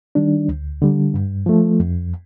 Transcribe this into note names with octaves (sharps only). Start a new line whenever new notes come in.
D#3 G3 D4
D2
D3 G3
G2
F3 A3
F2